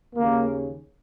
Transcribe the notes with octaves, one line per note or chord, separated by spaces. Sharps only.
D#2 C#3 A#3